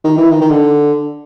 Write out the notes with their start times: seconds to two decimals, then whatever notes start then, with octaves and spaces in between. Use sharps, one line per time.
0.04 D#3
0.17 E3
0.30 D#3
0.41 D#3
0.51 D3